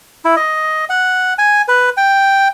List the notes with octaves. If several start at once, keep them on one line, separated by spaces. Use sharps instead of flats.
E4
D#5
F#5
G#5
B4
G5